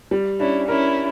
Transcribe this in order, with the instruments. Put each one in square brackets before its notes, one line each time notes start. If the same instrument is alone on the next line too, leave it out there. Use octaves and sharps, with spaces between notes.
[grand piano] G3
[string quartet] C#4 E4 [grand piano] D4
[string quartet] C#4 E4 [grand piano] A#4